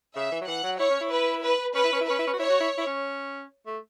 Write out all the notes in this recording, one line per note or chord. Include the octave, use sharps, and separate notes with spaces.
C#3 E5
E3
F#3
E3 F#5
F#3
E4 C#5
C#4
E4
B4
B4
C#4 B4
E4
C#4
E4
C#4 B4
E4
C#4
F#4
E4 C#5
F#4
E4
E4
C#4
A3